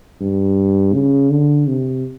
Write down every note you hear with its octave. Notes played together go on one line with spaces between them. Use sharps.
G2
C#3
D3
C3